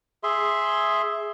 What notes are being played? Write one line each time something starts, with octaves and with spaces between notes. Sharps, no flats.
G#4 E5 C6